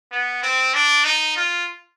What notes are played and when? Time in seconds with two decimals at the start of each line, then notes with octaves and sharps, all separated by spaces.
0.11 B3
0.43 C4
0.74 D4
1.05 D#4
1.36 F4